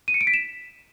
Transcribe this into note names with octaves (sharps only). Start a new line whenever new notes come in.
D#7
C#7
D7
B6
E7